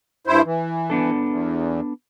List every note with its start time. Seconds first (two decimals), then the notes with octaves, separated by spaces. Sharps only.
0.27 G2 E4 C5
0.45 E3
0.90 B3 D4 A4
1.28 E2